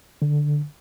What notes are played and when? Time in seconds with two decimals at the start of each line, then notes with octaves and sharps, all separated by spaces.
0.22 D3